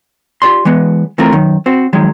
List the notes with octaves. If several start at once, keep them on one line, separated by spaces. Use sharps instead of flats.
F4 G4 D5 C6
E3 G#3 B3
E3 A3 C4 F4 A#4
F#2 D#3
C4 F#4 C5
D#3 F3 F#3 G#3